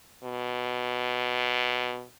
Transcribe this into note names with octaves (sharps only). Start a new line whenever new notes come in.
B2